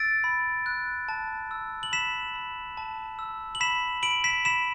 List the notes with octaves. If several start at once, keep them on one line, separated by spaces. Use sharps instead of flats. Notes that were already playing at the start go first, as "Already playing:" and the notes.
Already playing: E6 A6 D7
B5
F#6
A5
E6
F#7
B5 B6 E7
B5
A5
E6
F#7
B5 B6 E7
B5 D7 F#7
B6 E7
B5 B6 E7